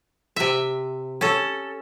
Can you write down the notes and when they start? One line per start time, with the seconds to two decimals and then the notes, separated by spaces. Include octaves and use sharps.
0.36 C3 E5
1.21 C#4 A4